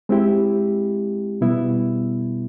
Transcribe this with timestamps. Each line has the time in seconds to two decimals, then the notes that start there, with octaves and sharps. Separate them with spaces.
0.09 G#3 C4 E4 G4
1.41 B2 G3 B3 E4